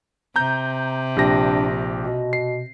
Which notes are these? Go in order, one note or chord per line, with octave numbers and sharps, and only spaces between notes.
C3 A#5 G6
A#1 D4 G4 A#6
B2
C7